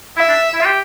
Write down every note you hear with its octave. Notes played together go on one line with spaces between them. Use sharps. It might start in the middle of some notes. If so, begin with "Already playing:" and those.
E4 E5
D4
E4
F4
G4